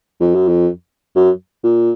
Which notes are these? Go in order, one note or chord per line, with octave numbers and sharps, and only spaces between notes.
F2
F#2
F2
F#2
A#2